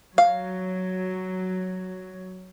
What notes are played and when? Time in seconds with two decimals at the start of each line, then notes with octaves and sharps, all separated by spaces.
0.18 F#3 F5